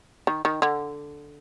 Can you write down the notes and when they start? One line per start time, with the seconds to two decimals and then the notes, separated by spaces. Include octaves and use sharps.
0.27 D#3
0.45 D#3
0.62 D3